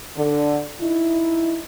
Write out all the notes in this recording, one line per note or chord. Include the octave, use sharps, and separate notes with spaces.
D3
D#4 E4